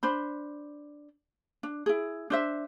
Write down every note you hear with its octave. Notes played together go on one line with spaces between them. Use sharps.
D4 C5 B5
D4
E4 G#4
D4 C5 E5